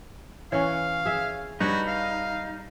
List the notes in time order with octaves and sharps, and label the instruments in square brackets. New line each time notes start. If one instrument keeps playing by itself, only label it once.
[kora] E3 C#4 [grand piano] C#5 [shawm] F5
[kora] G#4 E5
[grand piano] G3 [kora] D4 B4 C#5 [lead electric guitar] D#4 [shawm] F#4
[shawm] F5